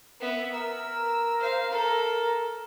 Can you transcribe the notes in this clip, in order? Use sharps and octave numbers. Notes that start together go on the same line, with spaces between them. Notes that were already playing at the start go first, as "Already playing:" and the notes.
B3 E5
A#4 E6
C5 F5
A4 A#4